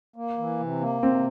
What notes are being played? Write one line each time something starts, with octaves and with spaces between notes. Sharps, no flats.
A#3
E3
C3
A#3
C3 C4